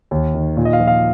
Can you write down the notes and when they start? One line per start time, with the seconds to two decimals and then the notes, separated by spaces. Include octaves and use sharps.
0.11 D#2
0.35 D#3
0.57 A#2
0.65 D#5
0.73 F5
0.80 F3
0.87 F5